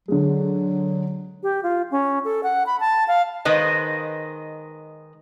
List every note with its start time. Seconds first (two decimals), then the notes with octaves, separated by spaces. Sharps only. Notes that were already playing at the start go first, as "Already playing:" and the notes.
0.08 D3 F#3 G#3
1.43 G4
1.63 F4
1.91 C#4
2.24 A4
2.43 F#5
2.66 B5
2.80 A5
3.08 F5
3.45 D#3 G#3 B4 C5 D#5